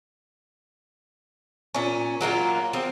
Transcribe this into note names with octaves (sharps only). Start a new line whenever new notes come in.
A#2 C#4
F#3 A#3 E4 F4
F3 C4